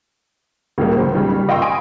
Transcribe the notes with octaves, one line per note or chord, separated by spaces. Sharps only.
C#2 A2 C#3 G3 G#3 A#3
C#3 F#3 C5
C#3 G3 D#4
G3
D#5 F5 G5 C6 C#6 E6
G#5 B5 D#6 D7